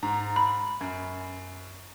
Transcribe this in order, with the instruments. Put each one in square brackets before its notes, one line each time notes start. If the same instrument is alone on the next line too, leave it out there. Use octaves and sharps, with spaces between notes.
[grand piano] G#2 A#5
[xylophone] B5
[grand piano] F#2